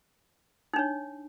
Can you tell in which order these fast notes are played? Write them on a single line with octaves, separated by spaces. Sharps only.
D#4 D4 C#5